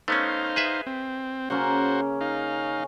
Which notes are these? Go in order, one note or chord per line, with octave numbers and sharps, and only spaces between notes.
A3 B3 C#4 D#4 C5 F5
G#4 B4 E5
C4
C#3 A#3 C#4 F#4 C5
D#4 F5